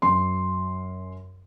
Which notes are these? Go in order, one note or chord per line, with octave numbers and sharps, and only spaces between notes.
F#2 C6